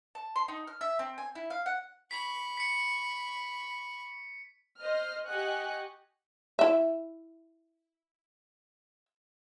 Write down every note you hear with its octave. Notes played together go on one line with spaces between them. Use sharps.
A5
C6
D#4
F6
E5
C4
G#5
E4
F5
F#5
B5 C#6 B6
B6 C#7
C5 D#5 F6
G4 D#5 F#5 G#5 C#6 F#6
E4 E5